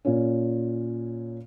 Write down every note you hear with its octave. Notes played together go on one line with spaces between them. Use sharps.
A#2 C#4